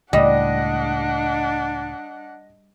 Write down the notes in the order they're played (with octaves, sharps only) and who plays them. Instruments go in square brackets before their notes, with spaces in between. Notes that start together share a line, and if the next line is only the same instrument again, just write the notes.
[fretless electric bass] C#2 A2 [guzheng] G3 [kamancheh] D4 F#5 [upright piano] D#5